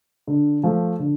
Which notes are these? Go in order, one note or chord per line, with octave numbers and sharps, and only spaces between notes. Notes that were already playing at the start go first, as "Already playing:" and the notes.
D3
F3 A3
D3